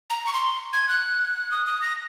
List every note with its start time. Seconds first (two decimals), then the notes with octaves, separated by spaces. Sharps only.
0.10 A#5
0.27 C#6
0.33 C6
0.73 G#6
0.89 F#6
1.51 D#6
1.66 D#6
1.82 A#6